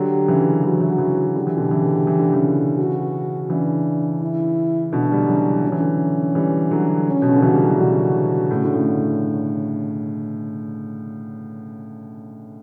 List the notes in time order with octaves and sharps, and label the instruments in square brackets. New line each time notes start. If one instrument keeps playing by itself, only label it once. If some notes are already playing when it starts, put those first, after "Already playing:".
Already playing: [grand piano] D3 F#3 [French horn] G4
[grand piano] C#3 E3
[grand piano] E3 [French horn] F#4
[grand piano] F#3
E3
F#3
C#3 E3
[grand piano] D3 [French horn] G4
[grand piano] E3
B2 D3
C#3 E3
E3
D3
C#3 E3
[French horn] F#4
[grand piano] C#3 E3 [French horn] D4
[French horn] E4
[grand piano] B2 D3 [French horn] D4
[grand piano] G3
F#3
C#3 E3
[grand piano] F#3 [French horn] C#4
[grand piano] E3
D3 F#3
E3 G3
D3 F#3
[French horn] C#4
[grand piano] B2
C#3
D3
[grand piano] C#3 E3 [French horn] F#4
[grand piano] G3
F#3
E3
[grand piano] B2 D3 [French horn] F#4
[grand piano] A2 C#3
D3
A2 C#3